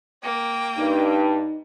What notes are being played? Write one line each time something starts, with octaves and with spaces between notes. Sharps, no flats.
A#3 G5
G2 D#4